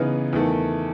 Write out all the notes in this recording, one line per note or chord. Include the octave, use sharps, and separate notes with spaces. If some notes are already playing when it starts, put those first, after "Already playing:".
Already playing: C#3 E3 B3 D#4
E2 D#3 A3